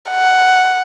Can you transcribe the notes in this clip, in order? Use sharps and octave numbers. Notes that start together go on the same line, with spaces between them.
F#5